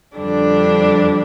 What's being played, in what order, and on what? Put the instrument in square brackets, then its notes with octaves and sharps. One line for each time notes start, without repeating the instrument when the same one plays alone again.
[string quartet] F2 D3 G3 D4